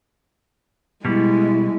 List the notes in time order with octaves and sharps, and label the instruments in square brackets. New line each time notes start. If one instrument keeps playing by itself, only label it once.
[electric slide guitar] B2 G3 [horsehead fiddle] G#3 E4